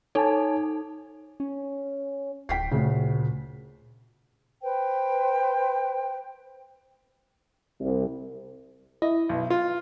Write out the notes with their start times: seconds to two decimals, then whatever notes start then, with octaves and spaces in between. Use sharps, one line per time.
0.15 D#4 A4 C#5 G#5 A5
1.40 C#4
2.49 D1 G5 B6 C7
2.72 D2 A#2 C#3
4.62 B4 C5 G5
7.80 C2
9.02 E4 D#5
9.29 B1
9.50 F4